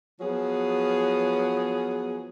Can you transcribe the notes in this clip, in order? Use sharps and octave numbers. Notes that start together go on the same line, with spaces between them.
F3 F#3 B3 G#4